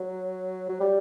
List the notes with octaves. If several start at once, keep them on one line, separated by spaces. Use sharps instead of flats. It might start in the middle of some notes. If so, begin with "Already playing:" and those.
Already playing: F#3
F#3
G3